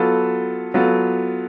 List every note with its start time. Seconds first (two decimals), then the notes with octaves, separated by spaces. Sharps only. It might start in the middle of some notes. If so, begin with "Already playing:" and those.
Already playing: F#3 B3 F4 A4
0.74 F#3 B3 F4 A4